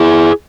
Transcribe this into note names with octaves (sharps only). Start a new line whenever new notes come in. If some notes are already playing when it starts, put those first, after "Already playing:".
Already playing: E4 G#4